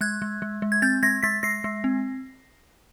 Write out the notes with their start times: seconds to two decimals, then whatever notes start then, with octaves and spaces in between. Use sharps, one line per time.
0.01 G#3 F#6 G#6
0.22 G#3
0.42 G#3
0.62 G#3
0.72 G#6
0.82 C4 G6 A6
1.03 G#3 G#6 A#6
1.23 G#3 A6 B6
1.43 G#3 A#6 C7
1.64 G#3
1.84 C4